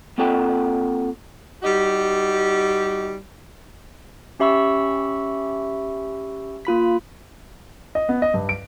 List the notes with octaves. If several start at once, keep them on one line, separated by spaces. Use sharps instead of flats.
A#3 C4 F4 A4 F#5 G5
G3 D#4 F#4 G4
C#4 G4 E5 B5 C#6 E6
A#3 F4 B5 B6
D#5
B3
D#5
G2
D7